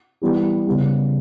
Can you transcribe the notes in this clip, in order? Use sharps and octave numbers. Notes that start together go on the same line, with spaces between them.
E3 G3 B3 E4 G4
C#3 G3 B3